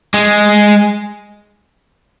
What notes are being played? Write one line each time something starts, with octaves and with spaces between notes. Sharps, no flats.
G#3